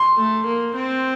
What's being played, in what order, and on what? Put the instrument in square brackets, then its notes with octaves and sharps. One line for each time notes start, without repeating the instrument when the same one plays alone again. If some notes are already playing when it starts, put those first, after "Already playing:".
Already playing: [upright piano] C6
[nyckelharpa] A3
A#3
C4